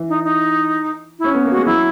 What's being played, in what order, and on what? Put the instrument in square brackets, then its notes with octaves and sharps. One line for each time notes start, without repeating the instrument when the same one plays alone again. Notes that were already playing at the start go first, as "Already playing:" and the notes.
Already playing: [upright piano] E3
[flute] D#4
D#4
E4
[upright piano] C#4
B3
A#3
[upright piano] G#3 [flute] F#4
[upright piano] F#3 [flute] E4